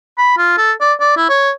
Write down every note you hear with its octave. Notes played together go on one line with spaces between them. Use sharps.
B5
F4
A4
D5
D5
E4
C#5